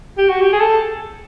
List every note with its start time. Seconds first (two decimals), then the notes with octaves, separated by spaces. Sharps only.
0.18 G4
0.29 F#4
0.41 G4
0.53 G#4
0.61 A4